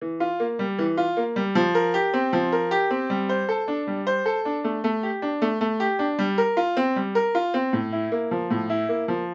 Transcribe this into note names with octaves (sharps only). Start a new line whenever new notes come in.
E3
F4
A#3
G3
E3
F4
A#3
G3
F3
A#4
G4
C4
F3
A#4
G4
C4
G3
C5
A4
D4
G3
C5
A4
D4
A3
A3
G4
D4
A3
A3
G4
D4
G3
A#4
F4
C4
G3
A#4
F4
C4
A2
E4
A#3
F3
A2
E4
A#3
F3